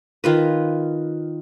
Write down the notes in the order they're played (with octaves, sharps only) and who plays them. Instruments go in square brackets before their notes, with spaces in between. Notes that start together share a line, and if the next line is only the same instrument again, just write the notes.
[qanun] D#3 F4 B4